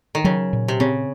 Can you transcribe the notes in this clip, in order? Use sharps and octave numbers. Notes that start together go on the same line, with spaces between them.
D#3
C#3 F#3
A#2
C3
C#3 C4